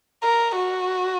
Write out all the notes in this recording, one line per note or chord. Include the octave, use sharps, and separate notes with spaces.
A#4
F#4